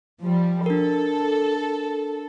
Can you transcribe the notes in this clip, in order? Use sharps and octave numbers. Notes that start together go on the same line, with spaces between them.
F3 G3
D4 A4 A#4